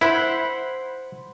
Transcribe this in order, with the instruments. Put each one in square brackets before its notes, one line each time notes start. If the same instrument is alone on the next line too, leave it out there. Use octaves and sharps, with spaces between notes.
[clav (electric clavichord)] E4 [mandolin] C5 F#5 B5